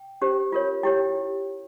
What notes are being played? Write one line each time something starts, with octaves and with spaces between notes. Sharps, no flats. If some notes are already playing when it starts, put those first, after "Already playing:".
Already playing: G5
C#4 G4 C5
F4 A#4 C#5
E4 G4 C#5 G5